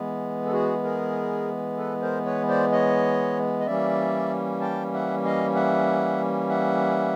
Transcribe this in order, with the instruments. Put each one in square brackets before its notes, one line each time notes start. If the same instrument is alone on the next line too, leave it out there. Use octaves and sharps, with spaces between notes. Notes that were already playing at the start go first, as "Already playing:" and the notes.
Already playing: [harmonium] E3 G#3 B3
A4
F#4 G#4
G#4 A#4
A4 B4
A#4 C5
B4 C#5
C5 D5
C#5 D#5
D#5
E3 G3 A#3 C#4 D5 E5
G5 A5
E5 F#5
D#5 F5
E5 F#5
E5 F#5